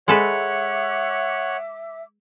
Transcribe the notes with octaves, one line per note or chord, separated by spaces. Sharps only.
G#3 A4 B4 C#5 E5 F#5 D6 E6